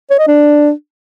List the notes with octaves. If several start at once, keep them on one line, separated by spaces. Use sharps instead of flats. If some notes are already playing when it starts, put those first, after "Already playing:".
C#5
D#5
D4